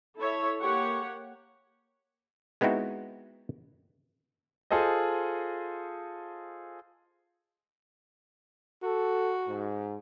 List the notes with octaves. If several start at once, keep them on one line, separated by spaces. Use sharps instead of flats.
E4 A4 C#5 E5
A#3 G4 C#5 F#5
G#3 B3 C4 D#4 E4 F#4
F4 G#4 A4 C5 D#5
F#4 A4
G#2